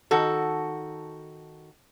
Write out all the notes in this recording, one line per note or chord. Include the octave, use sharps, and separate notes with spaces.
D#3 F#4 A4